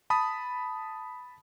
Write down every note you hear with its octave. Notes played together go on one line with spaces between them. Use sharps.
A5 B5 D#6